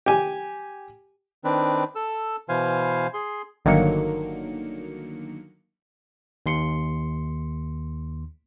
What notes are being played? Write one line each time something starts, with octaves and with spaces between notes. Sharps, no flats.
G4 G#5
D#3 C4 D4 B4
A4 E6
B2 E3 C5 F5 G#5
G#4 C6
G1 D3 D#3 F#3 A#3 C#7
D#2 C6 C#7